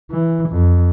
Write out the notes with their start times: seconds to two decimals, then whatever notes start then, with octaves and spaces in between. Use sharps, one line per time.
0.11 E3
0.50 F2